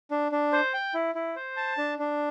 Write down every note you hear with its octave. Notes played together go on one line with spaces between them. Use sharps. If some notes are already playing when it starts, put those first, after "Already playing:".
D4
D4
C5
G5
E4
E4
C5
A5
D4
D4